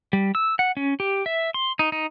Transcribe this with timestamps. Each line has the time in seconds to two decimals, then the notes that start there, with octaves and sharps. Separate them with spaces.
0.13 G3
0.35 E6
0.59 F#5
0.77 C#4
1.00 G4
1.26 E5
1.54 C6
1.79 D#4
1.92 D#4